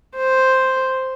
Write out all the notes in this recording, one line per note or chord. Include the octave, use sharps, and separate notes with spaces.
C5